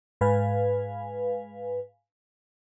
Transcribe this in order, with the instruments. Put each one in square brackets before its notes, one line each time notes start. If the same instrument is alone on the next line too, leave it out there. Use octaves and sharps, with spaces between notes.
[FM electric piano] G#2 B4 F5 G#5